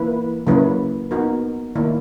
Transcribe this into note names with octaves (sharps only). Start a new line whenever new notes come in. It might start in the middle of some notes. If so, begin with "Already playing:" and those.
Already playing: E3 A#3 E4 B4
C#3 F#3 A#3 E4 B4
B3 D#4 F#4 A#4
D#3 A#3 E4